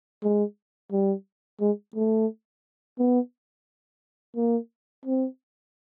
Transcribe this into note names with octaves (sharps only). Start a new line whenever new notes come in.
G#3
G3
G#3
A3
B3
A#3
C4